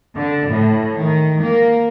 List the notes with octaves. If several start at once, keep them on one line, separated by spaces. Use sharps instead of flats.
D3
A2
D#3
A#3